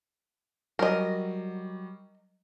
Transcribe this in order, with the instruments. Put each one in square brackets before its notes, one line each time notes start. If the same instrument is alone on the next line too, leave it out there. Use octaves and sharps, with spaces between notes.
[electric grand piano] F#3 G3 [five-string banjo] A#4 D#5